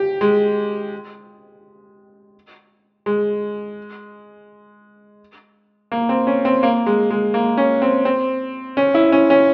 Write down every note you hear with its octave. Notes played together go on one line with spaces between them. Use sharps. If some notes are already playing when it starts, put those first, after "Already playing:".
Already playing: G4
G#3
G#3
A#3
C4
C#4
C4
A#3
G#3
G#3
A#3
C#4
C4
C4
C#4
E4
C#4
C#4